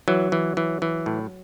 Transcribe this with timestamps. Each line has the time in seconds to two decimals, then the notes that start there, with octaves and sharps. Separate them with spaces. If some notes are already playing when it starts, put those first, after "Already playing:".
0.08 E3 F#3
0.32 E3
0.57 E3
0.82 E3
1.06 A2